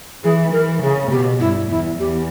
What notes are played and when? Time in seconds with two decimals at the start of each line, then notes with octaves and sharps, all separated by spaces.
0.24 E3 G#4
0.53 E3 A#4
0.82 C#3 G#4
1.11 B2 G4
1.40 G2 E4
1.70 E2 E4
1.99 E2 G4